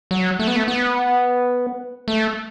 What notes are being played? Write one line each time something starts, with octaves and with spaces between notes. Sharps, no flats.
F#3
A3
B3
A3
B3
A3